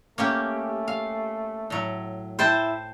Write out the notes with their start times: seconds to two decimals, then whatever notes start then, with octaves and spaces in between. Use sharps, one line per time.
0.18 A3 A#3 C#4 G4
0.88 F5
1.70 A2 F#3
2.39 E4 C5 G5 A5